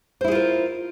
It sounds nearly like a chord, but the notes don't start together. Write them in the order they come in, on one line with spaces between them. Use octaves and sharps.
C5 E4 G#4 F4 A#4